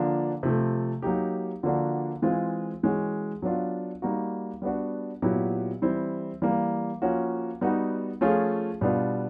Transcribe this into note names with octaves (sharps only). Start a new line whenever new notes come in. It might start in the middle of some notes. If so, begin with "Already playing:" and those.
Already playing: D3 F3 A#3 D4
C3 F3 A3
F#3 A#3 D#4 G4
D3 F3 A#3 D4 F#4
E3 G#3 C4 F4 G#4
E3 G#3 C#4 F#4
F#3 B3 D4 F4
G3 A#3 D#4 F#4
G3 B3 D4 F#4
A#2 F#3 B3 E4 G4
E3 G3 C4 E4
E3 G3 A#3
F3 A#3 C#4 F#4
G3 B3 D#4 F#4
F3 A3 C#4 F4 G#4
B2 G3 B3 D4 F4